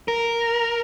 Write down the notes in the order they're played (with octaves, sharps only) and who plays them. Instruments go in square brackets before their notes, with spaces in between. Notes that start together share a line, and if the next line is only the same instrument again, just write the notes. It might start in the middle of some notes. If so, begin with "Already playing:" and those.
[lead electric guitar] A#4